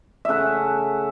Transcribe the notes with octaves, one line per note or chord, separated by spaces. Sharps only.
C#3 A3 E5 F#5